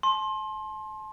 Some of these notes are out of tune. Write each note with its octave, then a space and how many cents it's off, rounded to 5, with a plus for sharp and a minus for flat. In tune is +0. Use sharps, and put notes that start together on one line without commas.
A5 -35 C6 +25